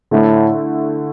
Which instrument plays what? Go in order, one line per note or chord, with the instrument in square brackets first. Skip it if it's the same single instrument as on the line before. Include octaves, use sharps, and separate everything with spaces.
[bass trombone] A2 [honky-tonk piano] D3 A3 E4